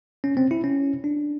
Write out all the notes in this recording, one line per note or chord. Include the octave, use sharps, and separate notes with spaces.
C#4
C4
E4
C#4
D4